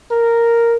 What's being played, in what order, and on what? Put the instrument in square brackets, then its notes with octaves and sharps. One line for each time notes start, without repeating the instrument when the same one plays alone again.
[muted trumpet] A#4